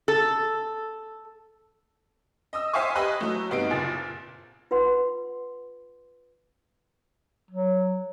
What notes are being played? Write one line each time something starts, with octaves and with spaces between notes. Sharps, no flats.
A4
D#5 D#6 E6
C5 E5 F5 G5 G#5 C#6
G4 B4 D#5 G#5 B5 F#6
F#3 A3
G2 C3 B3 D#4 C7 D7
F#1 A#2 G#4 A6
F4 B4 F#5 C6
F#3